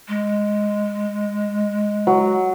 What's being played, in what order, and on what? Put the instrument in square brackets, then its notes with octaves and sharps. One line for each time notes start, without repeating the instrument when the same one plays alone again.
[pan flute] G#3
[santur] F#3